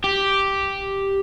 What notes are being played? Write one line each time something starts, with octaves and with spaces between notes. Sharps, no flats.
G4